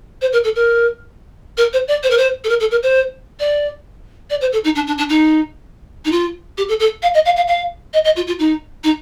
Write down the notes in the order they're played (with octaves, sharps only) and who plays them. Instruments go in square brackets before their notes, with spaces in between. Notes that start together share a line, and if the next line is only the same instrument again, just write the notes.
[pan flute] C5
A#4
A4
A#4
A#4
C5
D5
C5
A#4
C5
A4
A#4
A4
A#4
C5
D5
D5
C5
A4
D#4
D4
D4
D4
D#4
D#4
F4
G4
A4
A4
F5
D#5
F5
F5
F5
D#5
D#5
F4
F4
D#4
D#4